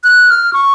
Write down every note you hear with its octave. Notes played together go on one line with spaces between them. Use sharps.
F#6
F6
C#6